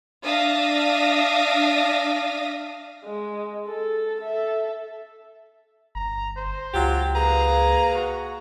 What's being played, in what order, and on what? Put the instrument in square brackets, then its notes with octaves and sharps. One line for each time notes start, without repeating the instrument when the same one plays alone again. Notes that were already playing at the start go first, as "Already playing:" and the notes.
[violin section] D4 E5 F5 D#6 A#6
[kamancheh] G#3
A4
A4 E5
[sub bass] G1 [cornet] A#5
[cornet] C5
[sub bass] C#2 [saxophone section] F#3 F4 G4
[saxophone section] A#3 G#4 B4 [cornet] A#5
[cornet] F#4